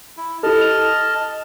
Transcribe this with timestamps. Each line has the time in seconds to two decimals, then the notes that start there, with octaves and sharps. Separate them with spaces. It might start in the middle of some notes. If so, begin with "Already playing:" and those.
0.17 E4
0.43 E4 G4 A4 D#5 A5 F6
0.61 F7